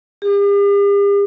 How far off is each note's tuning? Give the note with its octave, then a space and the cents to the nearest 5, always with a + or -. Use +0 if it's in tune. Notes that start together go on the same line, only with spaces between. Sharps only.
G4 +45